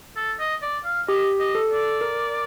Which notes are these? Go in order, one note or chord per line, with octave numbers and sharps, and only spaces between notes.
A4
D#5
D5
F5
G4 D#5
D#5
A4
D5
A#4